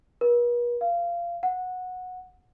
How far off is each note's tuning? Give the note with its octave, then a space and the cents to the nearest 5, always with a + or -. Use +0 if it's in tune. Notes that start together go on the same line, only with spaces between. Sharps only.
B4 -45
F5 -20
F#5 -15